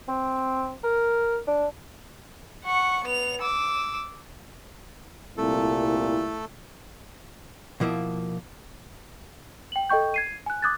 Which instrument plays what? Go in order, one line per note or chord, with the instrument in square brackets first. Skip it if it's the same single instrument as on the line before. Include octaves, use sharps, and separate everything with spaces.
[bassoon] C4
A#4
D4
[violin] F#5 C#6
B3 F7
D6 E6
[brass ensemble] C2 [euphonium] A#2 [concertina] A3 A4 [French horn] E4
[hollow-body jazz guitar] B2 F3 A#3 E4 D#5
[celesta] G5 F#7
A4 D#5 G5 C#6 G6
G#6 C7 D#7
G#5 F#6
D6 D#6 F#6 G#6 A6